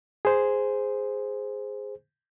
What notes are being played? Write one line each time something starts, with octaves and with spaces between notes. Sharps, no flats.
G#4 C5